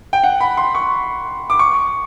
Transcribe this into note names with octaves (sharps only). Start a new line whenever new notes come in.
G5
F#5
B5
C6
C#6
D6
C#6